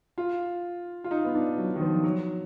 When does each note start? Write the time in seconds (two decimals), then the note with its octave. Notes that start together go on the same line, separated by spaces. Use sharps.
0.18 F4
1.04 F4
1.11 D#4
1.25 B3
1.35 D4
1.58 F#3
1.76 D#3
1.81 F3
2.04 F#3